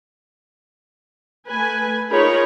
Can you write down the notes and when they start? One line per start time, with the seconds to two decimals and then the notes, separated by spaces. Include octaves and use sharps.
1.47 A3 B4 G#5
2.10 D#4 F4 G#4 A#4 C#5 B5